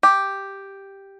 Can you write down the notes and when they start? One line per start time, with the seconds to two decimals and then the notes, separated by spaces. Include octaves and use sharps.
0.03 G4